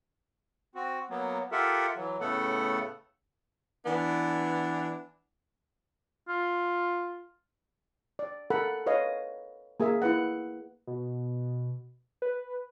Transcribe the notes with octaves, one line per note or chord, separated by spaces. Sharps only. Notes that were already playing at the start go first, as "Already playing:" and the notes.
C4 F#4
F#3 A#3 B3
F4 G4 A4 A#4 E5 F#5
E3 F#3
A2 C#3 A3 B3 A4 F#5
E3 B3 D4
F4
D5
A4 A#4 F#5 B5
B4 C#5 D#5 F5
A#3 G#4 A#4 E5
E4 B4 F#5
B2
B4